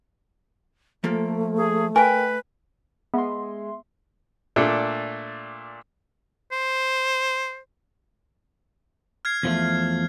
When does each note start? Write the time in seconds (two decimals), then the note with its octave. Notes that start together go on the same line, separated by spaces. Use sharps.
1.04 F3 A3 A#3 A4
1.57 G#4
1.96 A#4 B4 G5 G#5
3.14 G#3 B3 E5 C6
4.56 A#2 A3 D4 A4
6.52 C5
9.25 F6 G#6 C7
9.43 E2 F3 A3